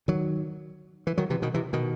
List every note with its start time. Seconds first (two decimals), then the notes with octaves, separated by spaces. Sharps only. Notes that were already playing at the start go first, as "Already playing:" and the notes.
0.08 D#3 F#3
1.07 E3
1.18 D#3 F#3
1.30 C3 E3
1.42 B2 D#3
1.54 C3 E3
1.73 B2 D#3